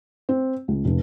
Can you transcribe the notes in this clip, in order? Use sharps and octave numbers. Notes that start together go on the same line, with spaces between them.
C4
C#2
F1